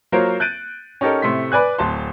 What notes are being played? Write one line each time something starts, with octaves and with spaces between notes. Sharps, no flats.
F#3 A#3 F4 A#4 C5 C#5
F#6 G6 A6 D7 D#7
C#4 D#4 G4 A4 A#4
A2 C3 A3 C6 B6
B4 D5 G#5 F#6
D1 A5 C6